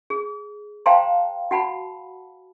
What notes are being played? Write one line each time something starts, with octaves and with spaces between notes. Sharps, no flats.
G#4
C5 F5 G5 A5 A#5 C6
F#4 F#5 A5 B5